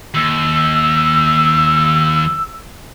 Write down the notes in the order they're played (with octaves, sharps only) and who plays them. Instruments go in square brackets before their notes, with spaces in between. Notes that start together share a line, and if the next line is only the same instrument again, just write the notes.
[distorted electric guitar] D#2 [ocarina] E6